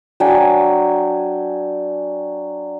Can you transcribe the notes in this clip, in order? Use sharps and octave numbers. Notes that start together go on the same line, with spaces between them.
F#3 D4 G5 G#5